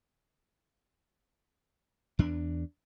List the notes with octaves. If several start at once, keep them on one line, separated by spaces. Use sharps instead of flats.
E2 D4